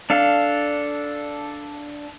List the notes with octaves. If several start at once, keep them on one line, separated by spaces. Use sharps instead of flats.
D4 A4 F5